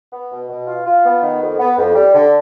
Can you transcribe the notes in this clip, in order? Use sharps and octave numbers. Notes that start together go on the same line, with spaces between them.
B3
B2
B2
F4
F4
B3
D#3
F2
B3
F2
G3
D3